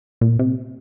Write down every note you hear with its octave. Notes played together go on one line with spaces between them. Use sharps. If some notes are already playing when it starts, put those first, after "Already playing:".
A#2
C3